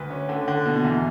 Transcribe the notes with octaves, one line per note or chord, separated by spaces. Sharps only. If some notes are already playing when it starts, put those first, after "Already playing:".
Already playing: D2 B4
C#4
D3
D3
B2
E2